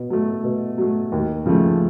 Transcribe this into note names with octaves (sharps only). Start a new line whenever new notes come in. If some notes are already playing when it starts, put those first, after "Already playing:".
Already playing: B2
F#3 A3
B2
F#3 A3
D#2
C#3 F3 A3